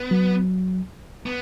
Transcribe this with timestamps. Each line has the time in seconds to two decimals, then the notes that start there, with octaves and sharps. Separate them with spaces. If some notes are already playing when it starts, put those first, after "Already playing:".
Already playing: B3
0.11 F#3
1.26 B3